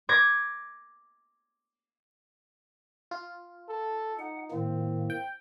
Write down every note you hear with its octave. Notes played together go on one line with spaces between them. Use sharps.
D6 G#6 A#6
F4
A4
D#4 F#5
A2 D#3 A#3 C4
G5